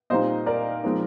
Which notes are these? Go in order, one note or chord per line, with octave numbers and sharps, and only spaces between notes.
A#2 G3 C4 D#4 C5 D#5
A#4 D5
F3 G#3 C4 D#4